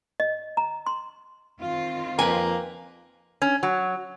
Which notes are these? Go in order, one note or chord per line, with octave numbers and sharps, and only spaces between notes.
D#5
A#5
C6
D#3 C4 F4
F2 A#3 B4 G5 G#5
C#4
F#3